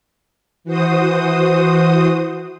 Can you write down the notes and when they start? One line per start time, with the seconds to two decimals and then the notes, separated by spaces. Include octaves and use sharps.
0.64 E3 F#4 C5 D#6